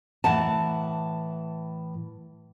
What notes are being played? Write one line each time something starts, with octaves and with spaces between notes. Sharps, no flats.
A2 E3 F#5 A5